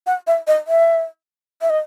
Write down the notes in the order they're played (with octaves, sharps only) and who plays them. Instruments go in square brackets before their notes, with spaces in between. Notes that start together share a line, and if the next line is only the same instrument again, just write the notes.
[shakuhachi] F#5
E5
D#5
E5
E5
D#5